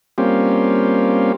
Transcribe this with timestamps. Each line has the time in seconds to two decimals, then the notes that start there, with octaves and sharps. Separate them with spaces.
0.18 G3 A#3 C4 C#4 F4 G4